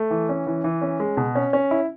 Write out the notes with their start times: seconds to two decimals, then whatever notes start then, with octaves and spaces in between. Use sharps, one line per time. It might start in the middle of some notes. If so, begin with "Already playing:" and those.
Already playing: A3
0.11 E3
0.29 C#4
0.47 E3
0.64 E3
0.82 C#4
1.00 G#3
1.17 B2
1.35 C#4
1.53 C#4
1.71 E4